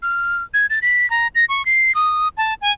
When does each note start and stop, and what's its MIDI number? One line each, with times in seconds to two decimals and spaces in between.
0.02 0.43 89
0.54 0.66 92
0.70 0.79 93
0.82 1.09 95
1.10 1.27 82
1.35 1.45 94
1.49 1.65 85
1.65 1.94 96
1.95 2.28 87
2.37 2.54 81
2.61 2.72 80